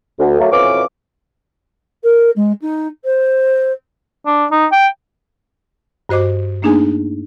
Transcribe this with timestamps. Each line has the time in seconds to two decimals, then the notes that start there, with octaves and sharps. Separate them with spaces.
0.19 D2
0.39 F#3 A3 A#3
0.52 F2 B2 E3 C#4 F5 D6
2.03 A#4
2.36 G#3
2.61 D#4
3.04 C5
4.26 D4
4.52 D#4
4.72 G5
6.09 G2 F#4 C5 D#5 D6
6.62 A3 A#3 D4 D#4 G#4 G#5